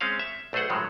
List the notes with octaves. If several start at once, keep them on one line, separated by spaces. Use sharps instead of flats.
G#3 C4 C#4 F5
E5
B1 A3 G#4 C5 F#5
A2 D#3 F3 F#3 G#3